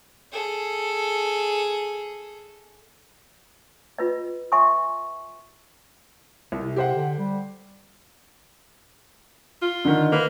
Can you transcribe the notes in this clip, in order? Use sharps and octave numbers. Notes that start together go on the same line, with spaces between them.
G#4 A4
F4 B4 D#5
E5 G#5 C6 C#6 D#6
C2 C3
G4 C5 F#5
D3
G3
F4
D3 D#3
A#3 B4